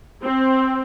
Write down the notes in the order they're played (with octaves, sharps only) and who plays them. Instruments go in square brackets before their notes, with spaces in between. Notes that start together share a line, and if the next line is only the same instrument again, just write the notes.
[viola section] C4